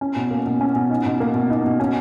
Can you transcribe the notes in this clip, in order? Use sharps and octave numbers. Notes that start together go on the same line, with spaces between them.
C#4
B2
A#3
B2
C#4
B2
D#4
B2
A#3
B2
D#4
B2
C#4